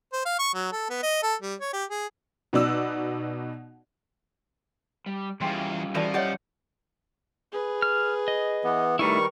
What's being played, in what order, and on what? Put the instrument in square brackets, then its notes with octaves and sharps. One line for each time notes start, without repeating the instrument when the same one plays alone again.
[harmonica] C5
F5
C#6
F#3
A4
B3
D#5
A4
G3
C#5
G4
G#4
[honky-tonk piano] B2 B3 D#4 F#4 D5 E6
[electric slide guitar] G3
[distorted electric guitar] E2 [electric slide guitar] G3 C#4 F4 [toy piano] G#4 G5 C6
[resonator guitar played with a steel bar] E3 F#4 [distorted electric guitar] F3 [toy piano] A4 D5 A5
[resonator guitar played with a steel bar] G4 F#5 [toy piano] C#5 D#5 E5
[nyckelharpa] G#4 B4
[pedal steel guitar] F6
D#5
[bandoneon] E3 B3
[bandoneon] D#3 G3 C#6 [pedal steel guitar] A3 D#4 E4 [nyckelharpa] A#4 B4